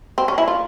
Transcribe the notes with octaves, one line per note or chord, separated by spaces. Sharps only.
C4
C#4
E4
F4